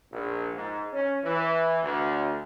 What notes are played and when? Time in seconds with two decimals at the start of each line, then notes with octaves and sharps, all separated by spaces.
0.12 A#1
0.55 G#2
0.93 C#4
1.24 E3
1.83 D2